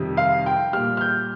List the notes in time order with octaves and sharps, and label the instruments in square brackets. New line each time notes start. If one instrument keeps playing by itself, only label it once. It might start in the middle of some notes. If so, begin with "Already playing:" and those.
Already playing: [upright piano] F2 C3 D#3 G3
F5
G5
A#2 G3 F6
F6
G6